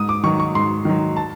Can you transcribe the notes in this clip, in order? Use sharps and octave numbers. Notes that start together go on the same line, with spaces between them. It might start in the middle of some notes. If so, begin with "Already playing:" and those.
Already playing: G#2 D#6
D6
D#3 F#3 C#6
C#6
G#2 C6
D#3 F#3
A5